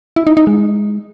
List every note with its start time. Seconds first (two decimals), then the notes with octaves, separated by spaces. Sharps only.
0.16 E4
0.27 D#4
0.37 D#4
0.47 G#3